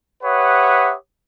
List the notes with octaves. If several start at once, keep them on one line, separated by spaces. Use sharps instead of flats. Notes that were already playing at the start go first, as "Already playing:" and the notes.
G4 B4 C#5 E5 F#5 D#6